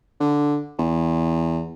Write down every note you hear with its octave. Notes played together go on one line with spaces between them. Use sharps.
D3
E2